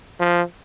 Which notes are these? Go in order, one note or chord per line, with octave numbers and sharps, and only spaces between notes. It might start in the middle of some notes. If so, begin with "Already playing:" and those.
F3